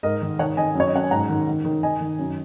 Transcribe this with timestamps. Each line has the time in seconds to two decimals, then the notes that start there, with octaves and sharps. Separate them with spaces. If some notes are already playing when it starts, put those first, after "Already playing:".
0.03 G#2 A#4 D#5
0.22 D#3
0.39 D#3 C#5 F#5
0.57 D#3 D#5 G#5
0.75 F#2 C#5
0.87 D#5
0.93 F#2 F#5
1.03 G#5
1.11 G#2 F#5 A#5
1.29 D#3
1.47 D#3
1.65 D#3
1.83 D#3 D#5 G#5
2.01 D#3
2.19 F#2